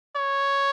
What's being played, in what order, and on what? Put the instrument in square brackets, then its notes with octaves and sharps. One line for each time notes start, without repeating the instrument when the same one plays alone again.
[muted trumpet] C#5